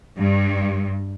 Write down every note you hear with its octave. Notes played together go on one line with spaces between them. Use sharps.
G2